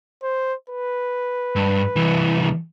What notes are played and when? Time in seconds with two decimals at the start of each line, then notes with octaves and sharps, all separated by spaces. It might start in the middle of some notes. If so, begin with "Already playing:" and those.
0.23 C5
0.70 B4
1.56 G2
1.96 C2 E3